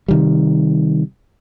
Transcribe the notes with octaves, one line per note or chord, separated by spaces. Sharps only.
C3 D#3 G3